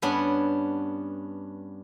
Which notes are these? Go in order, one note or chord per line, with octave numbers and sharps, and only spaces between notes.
G2 B3 C#4 D4